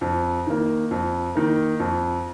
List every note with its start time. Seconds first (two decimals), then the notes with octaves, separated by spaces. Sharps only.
0.01 F2
0.47 D#3 A#3
0.91 F2
1.35 D#3 A#3
1.80 F2